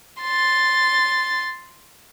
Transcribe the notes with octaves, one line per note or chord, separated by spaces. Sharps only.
C6 A6